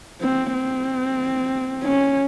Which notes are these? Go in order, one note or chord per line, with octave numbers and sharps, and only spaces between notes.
C4
C4
C#4